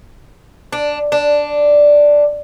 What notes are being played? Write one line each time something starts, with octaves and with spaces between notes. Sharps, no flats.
D4
D4